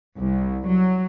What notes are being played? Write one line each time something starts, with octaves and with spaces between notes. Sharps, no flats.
C2
F#3